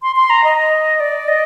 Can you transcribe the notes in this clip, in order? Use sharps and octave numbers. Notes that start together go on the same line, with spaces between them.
C6
C6
A#5
D#5
D5
D#5